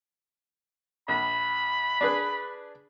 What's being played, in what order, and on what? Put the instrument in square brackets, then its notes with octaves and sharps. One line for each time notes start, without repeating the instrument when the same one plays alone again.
[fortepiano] A#1 [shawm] B5
[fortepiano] D4 G#4 B4